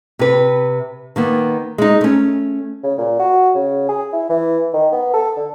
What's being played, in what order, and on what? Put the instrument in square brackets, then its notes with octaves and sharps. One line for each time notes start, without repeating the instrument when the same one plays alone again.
[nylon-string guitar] C3 B4
D#3 A#3 B3
G#3 D#4
A3 C#4
[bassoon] C#3
A#2
F#4
C#3
G#4
E4
E3
D#3
B3
A4
D3